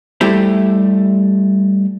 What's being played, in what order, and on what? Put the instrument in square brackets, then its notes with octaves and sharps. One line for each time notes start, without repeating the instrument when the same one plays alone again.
[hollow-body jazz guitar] G3 A3 E4 G4 C5